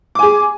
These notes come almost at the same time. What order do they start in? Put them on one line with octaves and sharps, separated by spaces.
D6 G#5 G#4